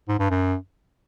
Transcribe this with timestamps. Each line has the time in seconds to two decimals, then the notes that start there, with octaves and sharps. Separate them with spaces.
0.09 G#2
0.20 G2
0.30 F#2